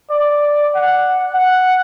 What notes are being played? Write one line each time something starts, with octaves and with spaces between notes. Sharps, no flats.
D5
F#5
F#5